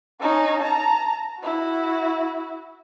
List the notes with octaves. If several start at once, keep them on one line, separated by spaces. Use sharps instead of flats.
C#4 D#4
A5 A#5
E4 F#4